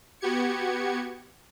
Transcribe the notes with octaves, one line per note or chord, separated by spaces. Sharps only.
B3 F#4 G4 G#6 C#7